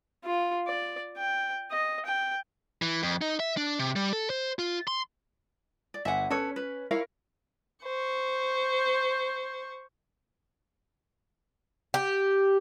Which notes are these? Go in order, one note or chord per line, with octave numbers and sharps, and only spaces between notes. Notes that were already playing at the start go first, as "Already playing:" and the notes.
F4
D5
G5
D#5
G5
E3
F2
D#4
E5
D4
C3
G3
A4
C5
F4
C6
D5
G1 E5 F#5 G#5
C#4 A4 B4 C#5
B4
E4 A#4 C#5 F5
C5 C#6
G4